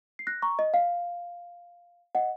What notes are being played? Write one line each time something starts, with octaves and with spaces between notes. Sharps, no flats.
C7
F#6 A#6
A#5 C#6
D#5
F5
D#5 F#5